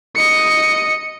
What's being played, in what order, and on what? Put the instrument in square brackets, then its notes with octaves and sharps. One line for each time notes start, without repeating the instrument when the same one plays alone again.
[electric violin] D#5 C#7